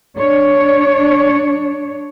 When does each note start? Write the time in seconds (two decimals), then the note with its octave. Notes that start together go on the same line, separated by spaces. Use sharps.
0.17 D4 C#5